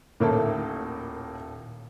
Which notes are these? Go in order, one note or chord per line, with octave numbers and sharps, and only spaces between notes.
D#1 D#2 A2 A#3 A4 E5